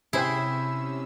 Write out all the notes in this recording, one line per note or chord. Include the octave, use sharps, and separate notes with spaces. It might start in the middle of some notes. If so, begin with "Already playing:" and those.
C3 C#4 E4 G#4 C5 G5 E6